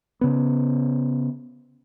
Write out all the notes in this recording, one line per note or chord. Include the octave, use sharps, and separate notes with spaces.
C#3 B3